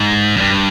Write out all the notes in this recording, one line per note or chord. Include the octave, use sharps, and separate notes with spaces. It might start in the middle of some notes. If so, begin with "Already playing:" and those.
Already playing: G#2
F#2
G2